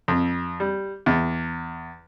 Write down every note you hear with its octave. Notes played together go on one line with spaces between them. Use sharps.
F2
G3
E2